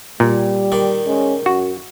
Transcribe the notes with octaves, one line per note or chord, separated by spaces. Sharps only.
A#2 G3
D#3 D5
G#3 C#4
F#2 F#4